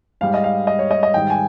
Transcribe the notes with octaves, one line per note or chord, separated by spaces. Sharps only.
G#2 G3 F5
D#5
F5
D#5
C#5
D#5
D#5
G#2 D#3 G3 G5
G#5